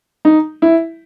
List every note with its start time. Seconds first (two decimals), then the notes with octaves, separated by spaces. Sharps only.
0.25 D#4
0.62 E4